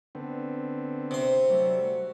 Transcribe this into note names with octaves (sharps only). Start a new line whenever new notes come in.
D3 B3 C4
C3 C6
F#3 G3 A3
F#4